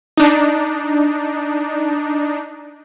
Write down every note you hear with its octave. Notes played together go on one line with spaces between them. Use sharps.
D4 D#4